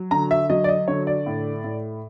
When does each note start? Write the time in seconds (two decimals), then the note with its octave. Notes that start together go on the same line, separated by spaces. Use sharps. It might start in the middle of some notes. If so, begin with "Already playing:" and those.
Already playing: F#3
0.11 D3 A#5
0.31 E5
0.50 F#3 D#5
0.64 D5
0.69 D#5
0.88 D3 C#5
1.07 D5
1.26 A2
1.64 A2